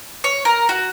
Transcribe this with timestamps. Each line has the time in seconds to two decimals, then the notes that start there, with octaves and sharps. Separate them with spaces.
0.24 C#5
0.45 A#4
0.69 F#4